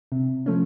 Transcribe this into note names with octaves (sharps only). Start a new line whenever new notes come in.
C3
F3 A3 C#4